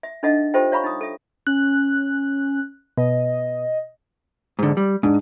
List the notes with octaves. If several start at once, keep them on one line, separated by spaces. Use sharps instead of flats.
E5
D4 D#4 A4 D#5 E5 F#5
F4 G4 A4 C5 E5 G5
C#5 E5 F5 A#5 B5 C#6
D#4 F5 D#6
A4 E5
C#4 F#6
B2 D#5
G#2 D3
G3
G#2 D4